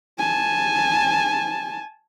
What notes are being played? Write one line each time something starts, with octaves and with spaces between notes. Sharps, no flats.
G#5 A5